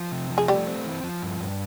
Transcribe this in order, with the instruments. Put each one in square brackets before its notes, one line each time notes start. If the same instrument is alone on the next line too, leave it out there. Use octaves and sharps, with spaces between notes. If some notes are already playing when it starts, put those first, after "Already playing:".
Already playing: [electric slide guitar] F3
C3
F3
[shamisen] G#4
[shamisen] G3 G4 [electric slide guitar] A3
[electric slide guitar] C4
E3
F3
G2
G2